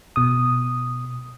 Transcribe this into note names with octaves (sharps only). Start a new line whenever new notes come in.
B2 D#6